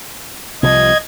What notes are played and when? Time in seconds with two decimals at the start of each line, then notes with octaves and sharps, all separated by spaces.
0.63 C2 C3 F3 D#5 G#6